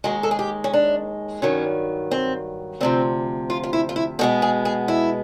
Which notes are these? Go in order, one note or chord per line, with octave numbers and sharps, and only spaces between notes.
D#2 D#3 G#3 F#4
A4
G#4
G4
C#4
D4
G2 D#3 F#3 C#4
C4
D2 C3 F3 C4
F4
F4
E4
F4
E4
B2 G#3 B3 F#4
G#4
G#4
E4